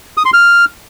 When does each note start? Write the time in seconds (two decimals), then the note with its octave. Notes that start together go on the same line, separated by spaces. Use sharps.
0.17 D#6
0.25 C6
0.33 F6